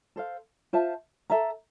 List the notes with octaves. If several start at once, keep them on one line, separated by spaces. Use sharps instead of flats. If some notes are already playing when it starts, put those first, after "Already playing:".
A4 C5 F5
F4 C5 E5 A5
A4 E5 A#5